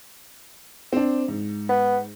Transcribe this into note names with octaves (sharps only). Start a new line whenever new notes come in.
C4 D4
G#2
B3